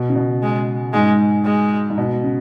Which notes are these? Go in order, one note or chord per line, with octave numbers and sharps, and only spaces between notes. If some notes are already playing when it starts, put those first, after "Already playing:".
Already playing: B2
C#3
B2
G#3
G#2 G#3
G#3
G#2
B2
C#3